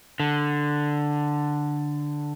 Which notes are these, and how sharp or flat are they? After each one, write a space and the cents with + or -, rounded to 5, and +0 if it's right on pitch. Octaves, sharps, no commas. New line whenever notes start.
D3 +5